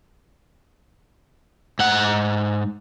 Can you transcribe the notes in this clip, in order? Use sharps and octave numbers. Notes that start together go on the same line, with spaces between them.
G#2 F#5